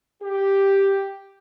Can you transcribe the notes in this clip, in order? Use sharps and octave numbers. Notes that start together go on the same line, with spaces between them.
G4